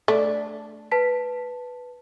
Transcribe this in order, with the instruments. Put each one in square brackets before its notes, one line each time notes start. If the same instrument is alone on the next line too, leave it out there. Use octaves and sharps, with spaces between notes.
[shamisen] A3 [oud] D4
[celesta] B4 A5 B6